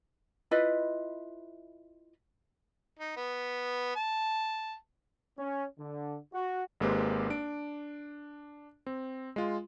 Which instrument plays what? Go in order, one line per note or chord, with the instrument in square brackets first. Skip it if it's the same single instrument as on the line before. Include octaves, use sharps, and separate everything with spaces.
[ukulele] E4 F4 B4 D#5
[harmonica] D#4
B3
A5
[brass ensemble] C#4
D3
F#4
[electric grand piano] G#1 G#3 A#3 C4 G4 B4
D4 D7
C4
G#3 F4